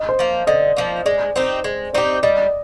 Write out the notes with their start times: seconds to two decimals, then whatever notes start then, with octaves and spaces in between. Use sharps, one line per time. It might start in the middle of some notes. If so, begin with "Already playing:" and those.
Already playing: D#5
0.09 C5
0.19 F3 A#3
0.47 D3 D#5
0.77 F3 A#3
1.06 G#3 D5
1.36 C4 D#4 G4 C5
1.64 G#3 C5
1.93 C4 D#4 G4 D5
2.23 G3 D#5